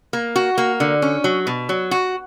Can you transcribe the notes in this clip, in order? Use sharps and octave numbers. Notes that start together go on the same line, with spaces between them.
A#3
F#4
A#3
D3
C#4
F#3
B2
F#3
F#4